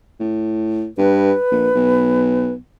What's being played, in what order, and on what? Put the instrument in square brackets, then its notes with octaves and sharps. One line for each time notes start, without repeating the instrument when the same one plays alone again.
[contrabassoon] A2
[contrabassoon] G2 [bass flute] B4
[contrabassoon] A#1
B1